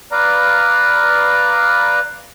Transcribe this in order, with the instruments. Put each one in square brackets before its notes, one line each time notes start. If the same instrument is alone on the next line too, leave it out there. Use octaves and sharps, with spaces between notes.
[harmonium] B4 D5 F5 A#5